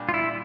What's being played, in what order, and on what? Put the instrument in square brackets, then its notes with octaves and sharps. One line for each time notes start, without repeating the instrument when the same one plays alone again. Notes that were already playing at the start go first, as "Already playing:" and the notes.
Already playing: [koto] A#2 G3 D4
[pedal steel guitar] F4
E4